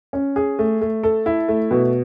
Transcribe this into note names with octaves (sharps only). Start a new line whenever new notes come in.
C#4
G#4
A3
A3
A4
E4
A3
B2